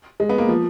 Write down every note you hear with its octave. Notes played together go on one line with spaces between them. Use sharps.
G#3
B3
A#3
F3